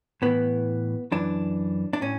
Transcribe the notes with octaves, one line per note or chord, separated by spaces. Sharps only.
A2 E3 B3
F#2 E3 D4
D4
A2 C#4